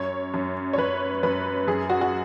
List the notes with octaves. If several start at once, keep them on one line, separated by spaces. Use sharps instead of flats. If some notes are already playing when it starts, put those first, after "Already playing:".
Already playing: F#2 C#5
F#2
C#5
F#2 B4
F#2 B4
F#2 G#4
F#4
F#4